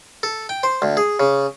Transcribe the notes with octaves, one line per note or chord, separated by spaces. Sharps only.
A4
G5
C5
D2
G#4
C#3